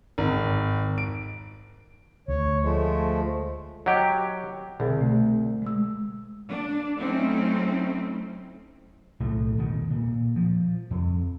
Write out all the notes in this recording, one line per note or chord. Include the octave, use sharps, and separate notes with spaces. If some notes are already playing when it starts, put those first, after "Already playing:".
G#1
D7
D2 C#5
F3 G#3 A3
F#3 G4 D#5
C2 B2 D3 G#4
A3
G#3 E6
D4
F#3 A3 C4 C#4 D#4 E4
B1 A2 A3
D#1 B2 D#3 B3
A#2
F3
F2